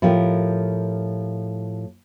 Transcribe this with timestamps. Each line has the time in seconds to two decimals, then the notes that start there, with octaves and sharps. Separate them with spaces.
0.02 A2 F3 G4 A#4